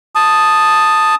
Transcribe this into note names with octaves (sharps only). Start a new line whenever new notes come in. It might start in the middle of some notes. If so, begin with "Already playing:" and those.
A5 D#6